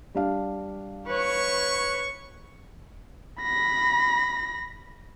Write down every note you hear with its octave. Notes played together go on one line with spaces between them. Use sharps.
G3 D4 F5
B4 C#5 C#6
B5 A#6